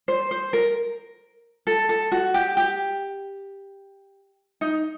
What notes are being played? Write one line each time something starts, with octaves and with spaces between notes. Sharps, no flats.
C5
C5
A#4
A4
A4
F#4
G4
G4
D#4